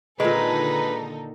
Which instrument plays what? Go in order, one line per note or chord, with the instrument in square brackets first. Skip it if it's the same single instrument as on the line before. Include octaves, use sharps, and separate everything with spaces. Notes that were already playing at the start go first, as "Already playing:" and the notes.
[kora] A#2 D#3 [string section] D3 D#4 A4 [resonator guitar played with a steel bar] G#3 [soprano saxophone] B4